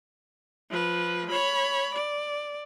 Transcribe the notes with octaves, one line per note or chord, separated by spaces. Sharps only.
F3 B4
C#5 B5
D5